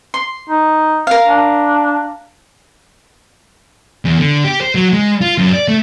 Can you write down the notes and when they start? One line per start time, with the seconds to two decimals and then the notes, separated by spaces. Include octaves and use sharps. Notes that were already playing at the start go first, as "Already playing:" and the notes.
0.14 C6
0.50 D#4
1.07 A#4 F5
1.27 D4
4.05 E2
4.19 D3
4.44 G4
4.61 C5
4.75 F#3
4.93 G#3
5.21 F4
5.38 F#2
5.53 D5
5.68 A3